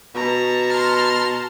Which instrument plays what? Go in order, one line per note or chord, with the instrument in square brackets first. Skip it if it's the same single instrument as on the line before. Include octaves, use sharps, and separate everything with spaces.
[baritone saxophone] B2 [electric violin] A5 A#5
[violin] C6 F6